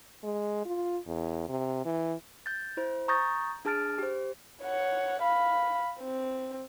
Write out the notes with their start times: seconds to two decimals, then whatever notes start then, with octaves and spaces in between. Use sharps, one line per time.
0.23 G#3
0.65 F4
1.07 E2
1.49 C3
1.85 E3
2.46 G6 A6
2.77 E4 C5
3.08 A#5 C#6 D#6 G6 A6 A#6
3.65 D4 G#4 A5 F6 A6 D7
3.98 G4 C5
4.63 C#5 F#5
5.22 F5 B5
6.00 C4